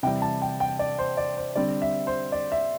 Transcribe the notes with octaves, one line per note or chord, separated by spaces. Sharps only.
C3 E3 G3 G5
A5
G5
G5
D5
C5
D5
C5
D3 G3 C4 D5
E5
C5
D5
E5